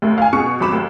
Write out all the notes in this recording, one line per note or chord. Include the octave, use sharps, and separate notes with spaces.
D#2 A3
F5 G#5
B2 G#4 C#6 C#7
G#1 F#3 B5 D6 E7
D#2